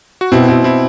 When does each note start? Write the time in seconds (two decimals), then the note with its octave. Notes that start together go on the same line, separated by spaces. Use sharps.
0.21 F#4
0.32 B2 C4 E4
0.48 B2 C4 E4
0.64 C4 E4